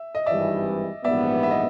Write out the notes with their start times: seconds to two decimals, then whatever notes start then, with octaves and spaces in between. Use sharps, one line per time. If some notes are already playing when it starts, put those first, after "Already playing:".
Already playing: E5
0.15 D#5
0.26 G#1 G2 E3 G3 D5 E5
1.04 A#1 G#2 E3 G3 B3 D5 E5
1.43 E5
1.51 D#5